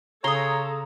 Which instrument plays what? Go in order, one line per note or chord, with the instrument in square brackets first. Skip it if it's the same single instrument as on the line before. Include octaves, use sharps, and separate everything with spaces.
[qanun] C#3 C6 [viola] A4 [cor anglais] C#5 [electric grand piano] A#5 D#6